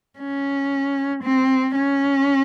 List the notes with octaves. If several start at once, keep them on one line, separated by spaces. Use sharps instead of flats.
C#4
C4
C#4